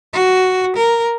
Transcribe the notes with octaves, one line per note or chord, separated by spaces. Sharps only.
F#4
A#4